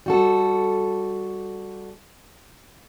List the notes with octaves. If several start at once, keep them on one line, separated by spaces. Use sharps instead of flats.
G3 F#4 A4